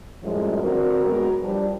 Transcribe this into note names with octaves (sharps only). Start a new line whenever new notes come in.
F#2 A2 F3 G3 G#3
D3 C4 F#4 A#4
F#3 G#3 B3 F#4 A#4
F3 G3 D4